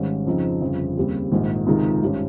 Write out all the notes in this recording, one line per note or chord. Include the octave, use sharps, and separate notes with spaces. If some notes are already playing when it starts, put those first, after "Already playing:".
Already playing: G#1 G#2 D#3 G3 C#4
F2 C#3 F3 C4 D#4
G1 F2 C#3
D#2 C#3 G3 C4
A#1 G#2 D#3
C#2 C3 D#3 G#3 D#4
G#1 G2 G3 C#4